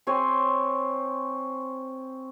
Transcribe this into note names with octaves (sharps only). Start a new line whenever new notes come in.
C4 C5 C#5 G#5